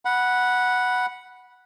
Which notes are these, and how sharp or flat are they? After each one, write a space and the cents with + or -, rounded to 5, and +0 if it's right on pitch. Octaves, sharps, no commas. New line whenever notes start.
F#5 +0 B5 -15